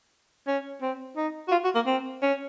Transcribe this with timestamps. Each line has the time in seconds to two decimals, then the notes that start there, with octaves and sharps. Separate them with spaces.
0.47 C#4
0.82 C4
1.17 D#4
1.48 F#4
1.51 F4
1.64 F#4
1.75 A#3
1.87 C4
2.23 C#4